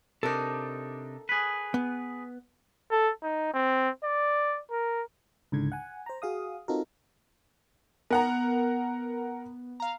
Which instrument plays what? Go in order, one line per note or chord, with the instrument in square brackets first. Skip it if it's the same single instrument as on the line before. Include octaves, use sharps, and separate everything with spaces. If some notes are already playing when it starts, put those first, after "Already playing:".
[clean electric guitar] C3 D4 D#4 [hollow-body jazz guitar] A4 A#4
[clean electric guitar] G#4 B4
[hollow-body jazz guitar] B3
[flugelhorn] A4
D#4
C4
D5
A#4
[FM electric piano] C#2 G#2 D3 G#6
F#5 G#5
C5 A#5
F#4 G#4 F5 D#6
C4 D#4 F4 F#4 A4 A#4
[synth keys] B3 [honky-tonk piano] A#4 F#5 A#5
[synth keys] F5 A#5